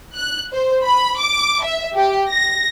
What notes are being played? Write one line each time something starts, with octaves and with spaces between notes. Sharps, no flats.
F#6
C5
B5
D6
E5
G4
A#6